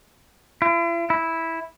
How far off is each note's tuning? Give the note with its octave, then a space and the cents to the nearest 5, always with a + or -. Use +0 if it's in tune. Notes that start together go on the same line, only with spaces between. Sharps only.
E4 +45
E4 -5